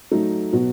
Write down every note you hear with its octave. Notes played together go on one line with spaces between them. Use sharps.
F#3 A3 D#4
B2 F#3 B3 F#4